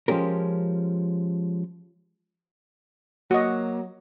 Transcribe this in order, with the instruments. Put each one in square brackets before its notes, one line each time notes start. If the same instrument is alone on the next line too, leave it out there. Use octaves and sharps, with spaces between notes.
[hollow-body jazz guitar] F3 G#3 C#4 G4 A#4
[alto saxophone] F#3 [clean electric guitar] A#3 [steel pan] F#4 D#5